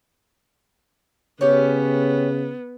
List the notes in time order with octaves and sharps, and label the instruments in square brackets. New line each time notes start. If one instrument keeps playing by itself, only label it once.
[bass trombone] C#3 [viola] B3 [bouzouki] C#4 G4